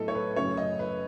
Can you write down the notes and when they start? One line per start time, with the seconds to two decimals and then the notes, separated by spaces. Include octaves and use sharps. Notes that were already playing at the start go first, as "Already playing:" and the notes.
Already playing: A2 F#3 B3 A4 D#5
0.08 C#5
0.15 B4
0.36 F#2 C#3 F#3 A3 C#4 C#5
0.57 D#5
0.79 B4